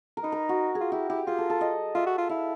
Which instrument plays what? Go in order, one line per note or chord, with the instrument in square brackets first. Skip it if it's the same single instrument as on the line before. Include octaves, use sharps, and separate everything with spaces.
[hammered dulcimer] A#4
[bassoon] D#4 [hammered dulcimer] B4
[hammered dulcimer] A#4
F#4
G#4
[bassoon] F4
[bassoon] E4 [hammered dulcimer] G4
[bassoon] E4 [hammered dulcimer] G4
[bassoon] F4 [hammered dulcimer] G#4
[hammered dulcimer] A4
A4
D#5
[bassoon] F4 [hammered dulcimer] E5
[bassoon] F#4
F4
[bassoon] E4 [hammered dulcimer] F5